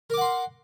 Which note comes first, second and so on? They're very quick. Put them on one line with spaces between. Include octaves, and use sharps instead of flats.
A#4 D6 F#5 C6